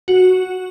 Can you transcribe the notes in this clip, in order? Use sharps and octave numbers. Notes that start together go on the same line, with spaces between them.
F#4